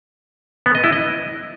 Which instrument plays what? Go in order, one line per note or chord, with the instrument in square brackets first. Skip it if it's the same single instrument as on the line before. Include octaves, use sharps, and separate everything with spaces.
[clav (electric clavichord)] B3
D#5
E4
D#5